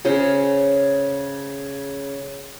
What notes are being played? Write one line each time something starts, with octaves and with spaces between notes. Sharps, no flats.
C#3 G#4 A#4 C5